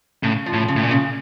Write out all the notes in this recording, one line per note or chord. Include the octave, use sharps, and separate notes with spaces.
A2 C#3
F3
A2
C#3
A2
A#2
C#3